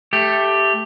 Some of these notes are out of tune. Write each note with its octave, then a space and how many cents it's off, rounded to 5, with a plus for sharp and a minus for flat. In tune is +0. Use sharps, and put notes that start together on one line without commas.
A3 +0 G4 +10